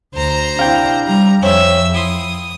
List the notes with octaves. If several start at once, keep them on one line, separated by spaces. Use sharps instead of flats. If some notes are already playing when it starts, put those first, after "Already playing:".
D2 C5 A#5
C3 D4 E4 F5 G5
G3 A#5
F2 C4 C#4 E5 E6
E4 C6 D#6